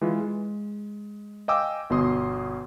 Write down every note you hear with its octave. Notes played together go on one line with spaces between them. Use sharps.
E3 G#3 F4
G#3
D#5 F5 G5 G#5 D6 E6
G1 B2 C6 D#6